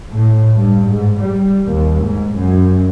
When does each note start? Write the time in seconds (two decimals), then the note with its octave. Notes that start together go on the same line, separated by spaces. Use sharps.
0.13 A2
0.57 G2
0.89 G#2
1.21 G3
1.66 D#2
2.02 G#2
2.35 F#2